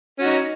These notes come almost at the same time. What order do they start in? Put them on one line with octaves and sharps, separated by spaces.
C#4 F#4 D#4